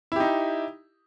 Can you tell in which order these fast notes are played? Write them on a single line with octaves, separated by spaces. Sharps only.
E4 G4 D#4